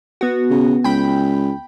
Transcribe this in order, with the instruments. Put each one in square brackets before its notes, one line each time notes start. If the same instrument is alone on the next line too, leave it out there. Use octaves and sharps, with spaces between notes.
[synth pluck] B3 F#4
[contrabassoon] C#3
[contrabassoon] C#2 [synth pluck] G5 B5